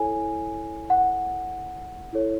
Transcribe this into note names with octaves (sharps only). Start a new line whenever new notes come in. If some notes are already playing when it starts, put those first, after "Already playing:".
Already playing: E4 A4 C#5 G#5
F#5
E4 A4 C#5